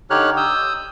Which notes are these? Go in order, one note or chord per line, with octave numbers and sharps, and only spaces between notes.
D3 D#4 G4 C#5 F6 F#6
D#6 E6 G6